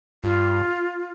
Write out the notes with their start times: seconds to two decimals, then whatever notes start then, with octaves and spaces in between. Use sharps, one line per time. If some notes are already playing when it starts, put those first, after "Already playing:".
0.24 G2 F4